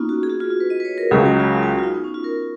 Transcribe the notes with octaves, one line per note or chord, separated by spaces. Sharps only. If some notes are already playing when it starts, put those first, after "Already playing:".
Already playing: A#3 B3 C#4 D#4 F4
F#4
G#4
F#4
F4
F4
B4
D#5
B4
C#5
A#4
C#2 C#3 F#3 G#4
F#4
F4
F4
F#4
F4
D#4
B3
C#4
F4
A#4